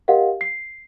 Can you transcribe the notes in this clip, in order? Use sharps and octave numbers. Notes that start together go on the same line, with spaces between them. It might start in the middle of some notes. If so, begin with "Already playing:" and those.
G4 A#4 D#5 F5 F#5
C7